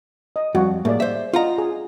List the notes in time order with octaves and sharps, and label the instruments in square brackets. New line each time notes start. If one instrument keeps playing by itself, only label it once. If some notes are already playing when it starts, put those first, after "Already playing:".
[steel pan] D#5
[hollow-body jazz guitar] F2 [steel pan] G3 F#4
[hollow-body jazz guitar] A2 [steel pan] A#3 G#4 D5
[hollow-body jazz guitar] C5 E5
[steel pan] D4 D#5 [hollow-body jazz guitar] F4 F#5 A#5
[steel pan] G#4